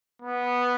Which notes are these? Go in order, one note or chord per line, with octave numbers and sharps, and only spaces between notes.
B3